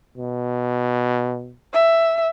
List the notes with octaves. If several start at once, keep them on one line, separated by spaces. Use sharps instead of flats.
B2
E5